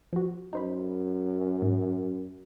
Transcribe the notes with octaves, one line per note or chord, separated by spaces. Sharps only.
F3 F#4
F#2 D#4 C5 B5
G#2